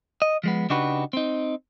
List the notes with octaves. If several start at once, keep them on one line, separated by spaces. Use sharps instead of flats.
D#5
F3 G#3 B3
C#3 D4 D#4 F#4 G4 B4
C4 D#4